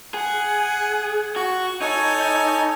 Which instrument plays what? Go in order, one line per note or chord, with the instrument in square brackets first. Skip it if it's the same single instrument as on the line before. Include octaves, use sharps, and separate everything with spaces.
[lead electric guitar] G#4 [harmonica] F#5
[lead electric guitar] F#4 [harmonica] C#6
[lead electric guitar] D#4 [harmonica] A4 C#5 G#5